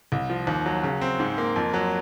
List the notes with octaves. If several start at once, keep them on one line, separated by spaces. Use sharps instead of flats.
C2
F3
D#2
F#3
C#3
C4
G#2
A#3
F2
F#3